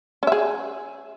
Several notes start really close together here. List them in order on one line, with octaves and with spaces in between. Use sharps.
C#4 E5 G#4